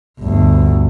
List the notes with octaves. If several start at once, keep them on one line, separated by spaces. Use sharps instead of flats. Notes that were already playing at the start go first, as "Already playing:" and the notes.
G1 D2